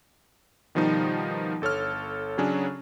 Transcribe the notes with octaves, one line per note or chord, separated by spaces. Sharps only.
B2 D#3 F3 G3 D#4
G1 A4 C#5 F6
C#3 F#3 C#4 D4 G#4